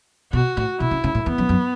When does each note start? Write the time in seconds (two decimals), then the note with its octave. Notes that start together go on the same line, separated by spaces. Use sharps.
0.33 B2 F#4
0.57 A2
0.80 B2 E4
0.91 C#3
1.04 C#3
1.15 A2
1.26 E2 B3
1.38 F#2
1.49 F#2